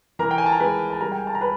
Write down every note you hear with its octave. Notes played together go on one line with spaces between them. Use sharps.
E3 A#4 A#5
G5
G#5
A5
A#5
G#3 B4 B5
A5
G3 A#4 A#5
G5
G#5
A5
A#5
B4 B5